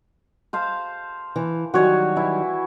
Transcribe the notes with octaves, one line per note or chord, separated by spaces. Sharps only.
C5 F5 A5
E3
D#3 F#3 G3 F#4 C#5 G#5
E3 E4